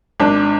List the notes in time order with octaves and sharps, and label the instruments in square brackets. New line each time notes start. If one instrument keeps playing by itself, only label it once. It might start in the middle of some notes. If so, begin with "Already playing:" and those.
[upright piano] G#1 D4